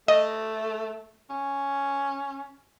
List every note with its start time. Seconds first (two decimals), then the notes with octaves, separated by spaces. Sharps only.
0.08 A3 D#5
1.30 C#4